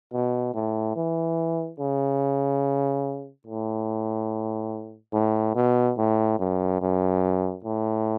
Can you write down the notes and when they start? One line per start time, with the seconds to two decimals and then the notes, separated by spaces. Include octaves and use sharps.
0.13 B2
0.54 A2
0.96 E3
1.79 C#3
3.47 A2
5.13 A2
5.55 B2
5.98 A2
6.39 F#2
6.81 F#2
7.64 A2